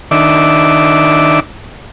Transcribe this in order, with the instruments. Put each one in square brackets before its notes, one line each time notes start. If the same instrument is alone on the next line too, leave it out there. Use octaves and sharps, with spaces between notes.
[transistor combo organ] D#3 D4 E5 D6